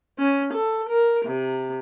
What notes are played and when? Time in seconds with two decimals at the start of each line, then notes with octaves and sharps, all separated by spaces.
0.19 C#4
0.53 A4
0.90 A#4
1.26 C3